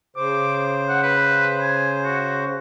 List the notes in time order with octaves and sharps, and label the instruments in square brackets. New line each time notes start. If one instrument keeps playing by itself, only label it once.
[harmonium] C#3 C5 [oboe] D6
[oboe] F#5
B4
G#5
F#4